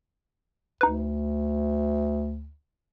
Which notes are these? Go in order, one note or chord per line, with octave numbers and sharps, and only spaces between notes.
D2 D#4 B4